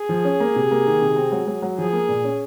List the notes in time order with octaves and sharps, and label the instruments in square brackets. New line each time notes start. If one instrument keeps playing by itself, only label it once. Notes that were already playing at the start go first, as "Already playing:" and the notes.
Already playing: [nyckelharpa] G#4
[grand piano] F3
C#4
A#3
C3
A#3
D#3
C3
C4
F#3
F#3
F#3
[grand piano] F3 [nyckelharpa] G#4
[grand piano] A#3
A#2
C#4